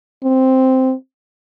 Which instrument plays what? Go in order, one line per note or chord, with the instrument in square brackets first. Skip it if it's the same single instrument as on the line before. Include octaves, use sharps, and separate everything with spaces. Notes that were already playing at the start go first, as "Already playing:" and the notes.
[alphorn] C4